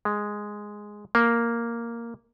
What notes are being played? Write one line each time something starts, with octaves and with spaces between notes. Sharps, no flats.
G#3
A#3